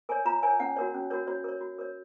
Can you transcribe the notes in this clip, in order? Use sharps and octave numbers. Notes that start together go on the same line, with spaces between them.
A#4 C#5 G#5
F4 A#5
A#4 C#5 G#5
C#4 F#5
F#4 A#4 C#5
C#4
F#4 A#4 C#5
F#4 C#5
A#4 C#5
F#4
A#4 C#5